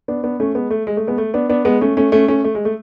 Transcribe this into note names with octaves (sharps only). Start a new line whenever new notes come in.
B3 D4
B3 D4
A3 C#4
G#3 B3
A3
G#3
A3
G#3 B3
A3
B3 D4
B3 D4
G#3 B3
A3 C#4
A3 C#4
A3 C#4
A3 C#4
A3
G#3
A3